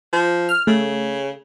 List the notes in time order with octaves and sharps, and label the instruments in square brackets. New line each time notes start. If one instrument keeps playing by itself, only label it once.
[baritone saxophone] F3
[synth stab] F6
[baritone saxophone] C#3 [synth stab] A3